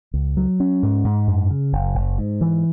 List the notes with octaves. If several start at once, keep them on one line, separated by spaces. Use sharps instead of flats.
C#2
F#3
C#4
G#2
G#2
F#2
C#3
F#1
F#1
G#2
E3